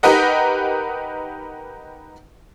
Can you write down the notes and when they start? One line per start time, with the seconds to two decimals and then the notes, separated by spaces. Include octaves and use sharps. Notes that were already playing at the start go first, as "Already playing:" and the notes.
0.03 D#4 G4 A#4 B4 D#5 F#5